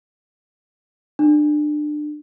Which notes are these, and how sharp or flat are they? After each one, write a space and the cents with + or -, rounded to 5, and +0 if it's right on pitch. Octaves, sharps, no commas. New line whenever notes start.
D4 +25